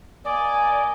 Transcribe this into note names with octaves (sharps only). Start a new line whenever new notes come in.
A#3 D5 D#5 G#5